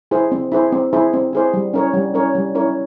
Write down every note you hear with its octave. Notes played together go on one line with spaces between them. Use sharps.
E4 G#4 C5
C4
E4 G#4 C5
C4
E4 G#4 C5
C4
E4 G#4 C5
G3
C#4 E4 A#4 C#5
G3
C#4 E4 A#4 C#5
G3
C#4 E4 A#4 C#5